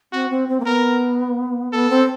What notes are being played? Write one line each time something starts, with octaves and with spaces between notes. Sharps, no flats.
C4 F#4
C4
C4
A#3
B3 A#4
B3 A4
C4